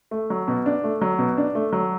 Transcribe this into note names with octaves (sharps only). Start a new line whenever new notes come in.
A3
F#3
B2
D4
A3
F#3
B2
D4
A3
F#3